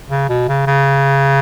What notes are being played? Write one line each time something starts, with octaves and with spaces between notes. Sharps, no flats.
C#3
B2
C#3
C#3